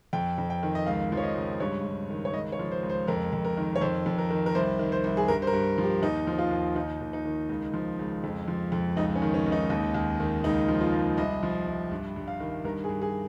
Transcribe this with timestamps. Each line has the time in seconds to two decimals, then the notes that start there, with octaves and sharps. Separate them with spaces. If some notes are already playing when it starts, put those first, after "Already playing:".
0.13 F2 G5
0.38 F2
0.50 G5
0.63 D#3
0.75 D#5
0.86 C#2 F5
1.12 F3
1.17 C#5
1.24 D#5
1.35 C#2
1.60 G2 C#5
1.85 G2
2.10 D#3
2.25 C#5
2.34 C#2 D#5
2.52 C#5
2.59 F3
2.72 C5
2.83 C#2
2.89 C5
3.07 F2 A#4
3.33 F2
3.45 A#4
3.57 D#3
3.76 C#5
3.81 F2 C5
4.06 F2
4.18 A#4
4.30 D#3
4.46 A#4
4.55 C2 C5
4.79 D#3
4.92 C5
5.04 C2
5.17 G#4
5.28 G2 A#4
5.42 C5
5.47 A#4
5.53 G2
5.78 F3
5.84 G4
6.02 D#2 D#4
6.27 F3
6.39 F4
6.51 D#2
6.76 D#2 D#4
7.01 D#2
7.13 D#4
7.25 D#3
7.49 C#2
7.74 F3
7.99 C#2
8.24 F2
8.48 F3
8.72 F2
8.96 C#2 D#4
9.15 C#4
9.22 D#3
9.34 C#4
9.46 C#2
9.52 D#4
9.70 D#2
9.94 D#2
10.20 D#3
10.44 C#2 D#4
10.68 F3
10.81 F4
10.93 C#2
11.17 C2 D#5
11.43 F3
11.67 C2
11.91 G2
12.16 G2
12.28 F5
12.40 D#3
12.65 G2 A#4
12.84 G#4
12.89 G2
13.02 G#4